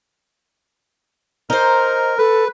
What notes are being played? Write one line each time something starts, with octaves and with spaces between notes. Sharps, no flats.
D#4 A#4 C5
A4 B4